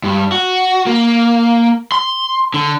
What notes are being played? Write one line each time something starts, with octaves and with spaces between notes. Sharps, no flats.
G2
F#4
A#3
C6
D3